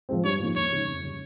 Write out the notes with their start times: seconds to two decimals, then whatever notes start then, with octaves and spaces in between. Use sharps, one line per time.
0.09 F3 G#3 C4
0.24 G2 C#5
0.40 F3 A#3 D#4
0.56 D#2 C#5
0.72 C#3 G#3 D#4
0.87 F2
1.04 C#3 G3